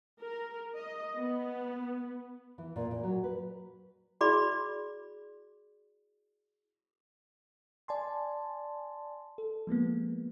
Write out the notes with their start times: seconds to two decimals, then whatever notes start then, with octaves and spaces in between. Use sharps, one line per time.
0.20 A#4
0.76 D#5
1.17 B3
2.58 E3
2.76 A#2
2.91 A#2
3.03 F#3
3.24 B4
4.21 E4 F#4 G#4 D5 B5 D6
7.88 D5 G#5 A5 C6
9.38 A4
9.67 F3 G#3 A#3 B3